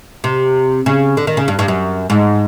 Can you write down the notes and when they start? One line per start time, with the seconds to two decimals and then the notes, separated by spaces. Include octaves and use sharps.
0.24 C3
0.86 C#3
1.17 D3
1.27 D#3
1.37 C#3
1.48 G2
1.59 G2
1.68 F#2
2.10 G#2